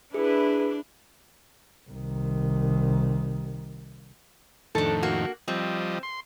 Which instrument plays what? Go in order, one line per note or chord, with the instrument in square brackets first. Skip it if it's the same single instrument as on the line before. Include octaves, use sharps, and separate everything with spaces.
[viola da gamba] D4 [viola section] E4 B4 [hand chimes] G#4
[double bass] C2 D#3
[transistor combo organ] F2 A2 D#3 [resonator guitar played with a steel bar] D4 A4
[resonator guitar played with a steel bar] A#3 F#4
[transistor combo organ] F3 G3 D#5 [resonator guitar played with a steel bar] C4
[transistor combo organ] C6